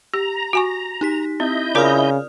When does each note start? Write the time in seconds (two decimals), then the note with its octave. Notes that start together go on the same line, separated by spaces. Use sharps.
0.14 G4 A#5
0.53 F#4 G#5 C#6
1.01 D#4 G4 B6
1.40 C4 E4 D#5 G6
1.75 C#3 C#4 F4 A#4 D5 D#6 F6